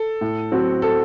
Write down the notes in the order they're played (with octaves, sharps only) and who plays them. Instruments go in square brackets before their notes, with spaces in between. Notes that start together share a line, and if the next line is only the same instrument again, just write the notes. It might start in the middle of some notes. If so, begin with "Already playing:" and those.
Already playing: [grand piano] A4
[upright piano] A2
F#3 C4 F#4
[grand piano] A4